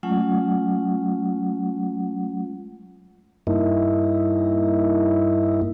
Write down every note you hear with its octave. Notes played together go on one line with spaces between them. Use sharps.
F#3 G#3 A3 C#4 F4 F#5
G2 A#3 D#4 E4